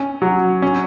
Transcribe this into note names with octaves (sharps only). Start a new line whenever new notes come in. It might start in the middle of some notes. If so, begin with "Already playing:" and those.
Already playing: C#4
F#3
C#4